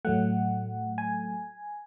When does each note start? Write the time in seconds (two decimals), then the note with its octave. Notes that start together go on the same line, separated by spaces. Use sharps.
0.05 A2 F#3 A3 F#5
0.98 G#5